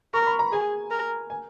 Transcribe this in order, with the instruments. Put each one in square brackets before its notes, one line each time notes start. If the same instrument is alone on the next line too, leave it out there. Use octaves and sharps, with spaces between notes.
[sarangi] A#4 [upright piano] C#6
[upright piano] B5
A#5
[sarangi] G#4 [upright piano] G#5
[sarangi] A#4
[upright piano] G#5